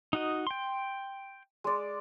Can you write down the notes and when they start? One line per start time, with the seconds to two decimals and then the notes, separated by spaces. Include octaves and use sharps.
0.13 D#4 F#4 D#5
0.47 G5 C6
1.64 G#3 D5